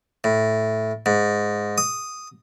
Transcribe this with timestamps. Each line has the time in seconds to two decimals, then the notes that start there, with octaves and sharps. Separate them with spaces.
0.24 A2
1.06 G#2
1.78 D#6